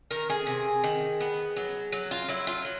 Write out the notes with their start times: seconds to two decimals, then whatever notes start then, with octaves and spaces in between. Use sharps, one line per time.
0.11 D#3 A#4
0.30 G#4
0.47 C3
0.84 D#3
1.21 B3
1.56 F#3
1.92 F#3
2.11 F4
2.28 F#3 E4
2.47 F4
2.65 F#3